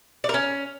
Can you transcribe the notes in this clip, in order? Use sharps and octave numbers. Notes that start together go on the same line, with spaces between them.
D5
A#4
C#4